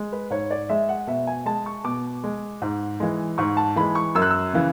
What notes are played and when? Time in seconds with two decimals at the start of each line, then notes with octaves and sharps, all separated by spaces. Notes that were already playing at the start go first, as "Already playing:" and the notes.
Already playing: G#3
0.12 B4
0.31 G#2 C#5
0.51 D5
0.69 G#3 E5
0.89 F#5
1.07 B2 E5
1.27 G#5
1.46 G#3 A5
1.66 C#6
1.84 B2 D6
2.24 G#3
2.62 G#2
3.00 E3 G#3
3.38 G#2 C#6
3.57 A5
3.76 E3 G#3 B5
3.95 C#6
4.15 F#2 E6
4.22 F#6
4.31 E6
4.53 C#3 E3